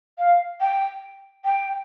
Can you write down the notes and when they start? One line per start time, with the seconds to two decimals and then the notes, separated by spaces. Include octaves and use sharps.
0.18 F5
0.61 G5
1.44 G5